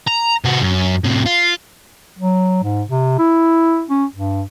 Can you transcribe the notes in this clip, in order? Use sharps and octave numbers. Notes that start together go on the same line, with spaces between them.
A#5
C3 F#4
F#2
A2 C3
F4
F#3
G#2
C3
E4
C#4
G2